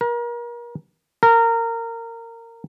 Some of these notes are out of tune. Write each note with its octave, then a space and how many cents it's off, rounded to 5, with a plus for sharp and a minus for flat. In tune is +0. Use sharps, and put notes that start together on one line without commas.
A#4 +35
A#4 -20